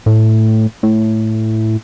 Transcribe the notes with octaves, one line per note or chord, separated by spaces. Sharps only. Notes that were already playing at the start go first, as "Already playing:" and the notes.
A2
A2